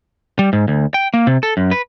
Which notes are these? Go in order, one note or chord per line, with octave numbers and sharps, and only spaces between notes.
G3
G#2
D2
G5
A#3
C3
A4
F#2
B4